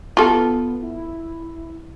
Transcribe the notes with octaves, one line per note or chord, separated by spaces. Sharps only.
B3 F4 A4
E4